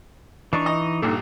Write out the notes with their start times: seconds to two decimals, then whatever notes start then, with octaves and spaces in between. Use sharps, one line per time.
0.53 E3 D4 D#4 C#6
0.66 D#5
1.02 A#1 G2 D#4 A4